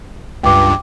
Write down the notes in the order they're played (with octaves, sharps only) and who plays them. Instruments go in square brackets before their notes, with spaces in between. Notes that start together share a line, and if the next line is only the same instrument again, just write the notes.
[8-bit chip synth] C#2 G2 [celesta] G5 D6